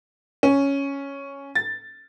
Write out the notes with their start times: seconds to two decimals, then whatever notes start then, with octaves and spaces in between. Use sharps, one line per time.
0.43 C#4
1.55 A6